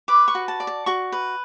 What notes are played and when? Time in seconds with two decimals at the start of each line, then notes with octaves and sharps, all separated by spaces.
0.08 B4 D6
0.28 C#6
0.35 F#4
0.48 A5
0.60 D5
0.67 A5
0.86 F#4 C#6
1.12 B4